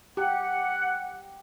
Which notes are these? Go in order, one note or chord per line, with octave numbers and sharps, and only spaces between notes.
G4 F#5